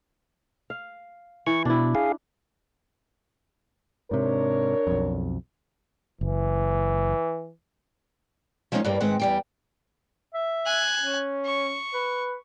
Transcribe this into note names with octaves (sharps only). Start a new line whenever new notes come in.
F5
E3 C#6
B2 D4 E4
G#4 F5
G#2 C3 D4 A#4 C#5
B1 F2
F#1 E3
F3 G#3 A#3 B3 C#4 D#4
G2 G3 A#3
G#2 D#3 G#3 C4 B4 F#5
E2 G3 G5
E5
G#5 F#6
C#4
C#6
B4